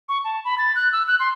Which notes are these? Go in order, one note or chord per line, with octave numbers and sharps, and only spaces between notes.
C#6
A5
B5
A6
F#6
E6
F#6
C6